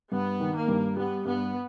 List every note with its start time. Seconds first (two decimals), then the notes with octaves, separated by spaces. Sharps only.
0.11 G2 B3
0.40 D#3
0.54 A#3
0.68 G2
0.96 G3 B3
1.25 G2 B3